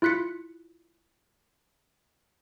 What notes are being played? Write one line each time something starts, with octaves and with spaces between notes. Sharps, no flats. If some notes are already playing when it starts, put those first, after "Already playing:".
E4 F4 F#6 B6 C#7